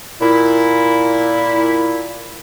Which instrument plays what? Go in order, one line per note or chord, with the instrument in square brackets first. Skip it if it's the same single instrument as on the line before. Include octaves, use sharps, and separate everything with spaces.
[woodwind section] A#2 E4